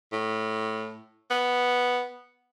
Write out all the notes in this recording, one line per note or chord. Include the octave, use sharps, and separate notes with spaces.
A2
B3